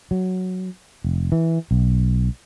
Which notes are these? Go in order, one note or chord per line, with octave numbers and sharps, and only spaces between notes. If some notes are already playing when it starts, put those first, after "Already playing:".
F#3
F1
E3
B1